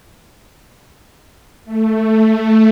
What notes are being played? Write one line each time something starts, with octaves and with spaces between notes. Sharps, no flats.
A3